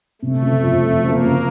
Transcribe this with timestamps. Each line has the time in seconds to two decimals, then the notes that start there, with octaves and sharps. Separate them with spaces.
0.21 C3 A3
0.42 F#1
0.63 F2
0.83 F2
1.03 F#1 A#3
1.24 F#1